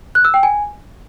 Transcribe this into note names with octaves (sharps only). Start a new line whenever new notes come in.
F#6
E6
G5
G#5